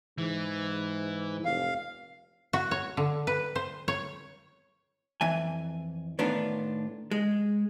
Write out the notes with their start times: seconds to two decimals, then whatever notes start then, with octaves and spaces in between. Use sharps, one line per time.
0.18 G#2 E3
1.45 F1 F5
2.53 F#4
2.71 C#5
2.97 D3
3.27 B4
3.56 C5
3.88 C#5
5.21 F2 E3 G#5
6.19 A2 D#3 B3 D4 F4
7.11 G#3